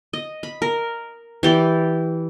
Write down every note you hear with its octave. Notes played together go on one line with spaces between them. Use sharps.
D#5
B5
A#4
E3 G4 D5